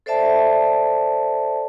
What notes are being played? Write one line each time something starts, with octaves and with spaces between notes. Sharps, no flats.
A4 C5 D5 E5 A5